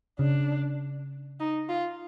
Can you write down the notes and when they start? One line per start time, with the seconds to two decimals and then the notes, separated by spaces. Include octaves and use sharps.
0.19 C#3 D4
1.40 D#4
1.69 F4